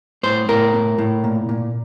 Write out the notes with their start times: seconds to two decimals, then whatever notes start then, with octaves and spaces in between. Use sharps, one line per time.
0.23 A2 C5
0.49 A2 A#4
0.74 A2
0.98 A2
1.24 A#2
1.49 A#2